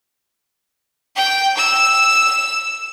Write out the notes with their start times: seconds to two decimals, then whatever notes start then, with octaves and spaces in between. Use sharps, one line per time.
1.16 G5
1.57 E6